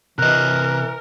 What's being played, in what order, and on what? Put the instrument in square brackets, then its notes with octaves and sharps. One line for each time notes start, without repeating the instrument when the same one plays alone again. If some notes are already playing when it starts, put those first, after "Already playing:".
[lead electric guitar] C3 D#5 [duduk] E3 [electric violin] A#4 [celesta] F#6